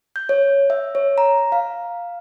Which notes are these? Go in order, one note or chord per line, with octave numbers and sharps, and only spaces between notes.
G6
C#5
E5
C#5
A#5
F5